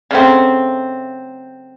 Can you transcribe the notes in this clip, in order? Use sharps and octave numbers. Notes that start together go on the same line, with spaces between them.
C#3 F#3 A3 C4